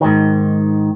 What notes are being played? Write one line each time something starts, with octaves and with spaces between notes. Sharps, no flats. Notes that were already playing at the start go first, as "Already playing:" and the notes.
G#2 D#3